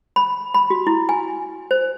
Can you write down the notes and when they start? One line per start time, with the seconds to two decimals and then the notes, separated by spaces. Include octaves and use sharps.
0.16 B5
0.54 B5
0.70 F#4
0.87 E4
1.09 G#5
1.71 C5